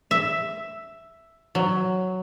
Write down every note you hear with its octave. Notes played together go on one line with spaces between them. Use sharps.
E5
F#3